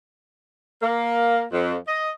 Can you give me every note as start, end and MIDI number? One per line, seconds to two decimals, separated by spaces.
0.82 1.44 58
1.52 1.75 41
1.88 2.11 75